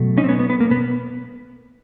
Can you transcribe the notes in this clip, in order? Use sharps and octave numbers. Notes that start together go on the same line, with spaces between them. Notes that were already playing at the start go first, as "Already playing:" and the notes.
Already playing: B2 F#3 A3
C#4 D#4
C4
B3 C#4
B3
B3
A#3
B3